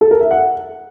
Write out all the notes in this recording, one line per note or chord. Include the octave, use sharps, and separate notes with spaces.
A4
A#4
E5
F#5